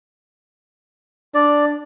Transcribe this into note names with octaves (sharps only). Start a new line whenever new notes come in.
D4 D5